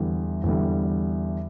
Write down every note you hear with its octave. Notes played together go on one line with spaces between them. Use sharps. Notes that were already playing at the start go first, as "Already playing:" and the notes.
Already playing: E2 D3 G3
E2 D3 G3